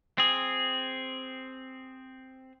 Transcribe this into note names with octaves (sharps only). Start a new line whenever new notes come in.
C4 G#4